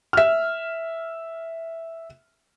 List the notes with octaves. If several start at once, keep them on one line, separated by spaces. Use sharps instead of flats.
E5 F6